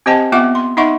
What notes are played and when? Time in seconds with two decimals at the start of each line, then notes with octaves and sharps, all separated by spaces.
0.06 C4 G4 C5 D#5 G5 A5
0.32 A#3 B3 F4 E5 F#5 D6
0.55 C6
0.77 D#4 D#5 E5 F#5 C6 C#6